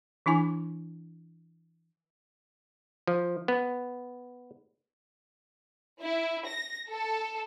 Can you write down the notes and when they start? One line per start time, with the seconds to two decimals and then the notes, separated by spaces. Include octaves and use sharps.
0.26 E3 D4 E4 G#5 D6
3.07 F3
3.48 B3
6.02 E4
6.47 A#6
6.90 A4